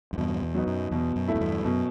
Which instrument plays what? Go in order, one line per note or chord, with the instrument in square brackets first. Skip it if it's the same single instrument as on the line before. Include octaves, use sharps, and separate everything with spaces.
[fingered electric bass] F#2
[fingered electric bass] E2 G2 [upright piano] B2
[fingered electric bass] E2
[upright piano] F#3 B3 D#4
[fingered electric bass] F#2
[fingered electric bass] E2 [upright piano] B2
[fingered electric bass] F#2
[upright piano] A3 E4
[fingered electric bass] F#2
E2 G2
[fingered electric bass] F#2 [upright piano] B2